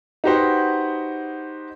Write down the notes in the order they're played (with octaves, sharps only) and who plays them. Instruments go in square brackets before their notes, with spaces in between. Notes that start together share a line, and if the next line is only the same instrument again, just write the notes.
[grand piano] D#4 F#4 G4 B4 C5 F#5